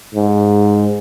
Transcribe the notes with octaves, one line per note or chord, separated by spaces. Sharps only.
G#2